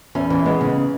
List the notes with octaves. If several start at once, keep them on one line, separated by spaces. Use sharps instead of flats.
E2 C#4
E3
G#3 B3
C#3